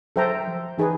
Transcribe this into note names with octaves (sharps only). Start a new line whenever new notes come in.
F#3 A4 C5 E5 G5 A#5
F3
E3 D#4 G#4 B4